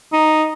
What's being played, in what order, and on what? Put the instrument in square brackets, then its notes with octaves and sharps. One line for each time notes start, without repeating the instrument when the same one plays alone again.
[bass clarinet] D#4